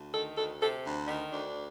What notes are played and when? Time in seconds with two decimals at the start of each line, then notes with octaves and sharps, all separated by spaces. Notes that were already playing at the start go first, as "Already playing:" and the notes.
Already playing: D2
0.14 D#3 A4
0.37 D2 A4
0.61 C3 A4
0.85 D2
1.08 D#3
1.32 D2 D4